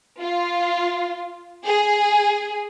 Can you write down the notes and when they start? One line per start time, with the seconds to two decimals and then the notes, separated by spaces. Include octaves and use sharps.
0.21 F4
1.64 G#4